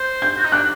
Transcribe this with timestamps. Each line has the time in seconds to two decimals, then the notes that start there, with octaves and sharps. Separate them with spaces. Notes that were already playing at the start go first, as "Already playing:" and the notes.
Already playing: C5
0.22 G6
0.38 F#4
0.44 D#4
0.52 D4 F#6